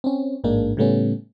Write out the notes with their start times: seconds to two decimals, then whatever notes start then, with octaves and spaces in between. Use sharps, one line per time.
0.04 C4 C#4
0.44 A1 G#2 G#3 A#3 D4
0.77 A2 C#3 G3 A3 B3 C#4